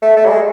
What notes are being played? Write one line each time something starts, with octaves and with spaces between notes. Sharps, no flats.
A3
A3
G3
G#3